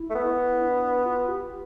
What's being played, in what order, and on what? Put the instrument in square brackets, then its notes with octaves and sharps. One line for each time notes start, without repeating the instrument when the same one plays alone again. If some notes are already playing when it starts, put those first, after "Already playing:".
Already playing: [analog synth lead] E4
[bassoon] A3
B3
[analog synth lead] D4
F4
G4